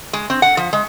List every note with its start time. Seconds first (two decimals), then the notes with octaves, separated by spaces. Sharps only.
0.13 G#3
0.30 C4
0.42 F#5
0.57 F3
0.73 G#3